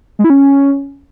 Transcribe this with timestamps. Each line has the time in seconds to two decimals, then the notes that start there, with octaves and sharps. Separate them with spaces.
0.19 G#3
0.24 E4
0.30 C#4